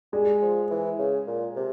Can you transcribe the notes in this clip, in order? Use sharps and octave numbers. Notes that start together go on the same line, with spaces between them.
G3 G#3
F3
E3
C#3
A#2
C3